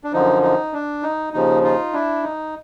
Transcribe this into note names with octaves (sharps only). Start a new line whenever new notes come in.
D4
F#2 D3 F3 D#4
D#4
D4
D#4
D#2 C#3 F3 D#4
D#4 F4
D4 E4
D#4